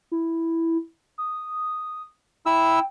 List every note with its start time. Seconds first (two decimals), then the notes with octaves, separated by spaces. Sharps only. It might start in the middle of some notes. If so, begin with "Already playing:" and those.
0.12 E4
1.18 D#6
2.46 E4 G5 E6